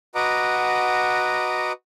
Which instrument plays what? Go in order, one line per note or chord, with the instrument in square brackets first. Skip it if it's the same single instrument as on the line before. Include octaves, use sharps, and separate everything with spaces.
[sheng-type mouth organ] F#4 B4 D#5 F#5 A#5 D6